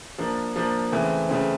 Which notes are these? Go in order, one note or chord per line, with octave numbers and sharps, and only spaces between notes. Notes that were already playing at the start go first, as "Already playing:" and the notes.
F3 A#3 D4
F3 A#3 D4
C#3 E3 A3 C4
C#3 E3 A3 C4